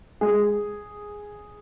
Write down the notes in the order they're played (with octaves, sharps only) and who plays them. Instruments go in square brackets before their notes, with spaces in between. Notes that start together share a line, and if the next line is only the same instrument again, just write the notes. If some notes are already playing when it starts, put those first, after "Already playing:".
[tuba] G#3 [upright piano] G#4